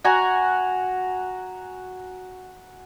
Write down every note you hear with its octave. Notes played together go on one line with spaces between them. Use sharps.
F#4 F#5 G#5 A#5